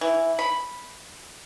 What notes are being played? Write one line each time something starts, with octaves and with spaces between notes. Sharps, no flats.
E3
B5